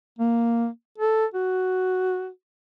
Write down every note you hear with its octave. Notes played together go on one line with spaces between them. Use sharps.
A#3
A4
F#4